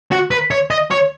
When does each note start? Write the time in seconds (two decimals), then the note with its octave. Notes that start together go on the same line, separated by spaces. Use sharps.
0.12 F#4
0.31 B4
0.51 C#5
0.71 D#5
0.91 C#5